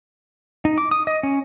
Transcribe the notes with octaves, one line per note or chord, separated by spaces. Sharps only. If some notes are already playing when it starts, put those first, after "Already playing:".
D#4
D6
D#6
D#5
C#4